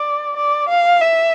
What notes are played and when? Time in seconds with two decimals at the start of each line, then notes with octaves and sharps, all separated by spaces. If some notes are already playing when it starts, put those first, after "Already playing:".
Already playing: D5
0.36 D5
0.69 F5
1.01 E5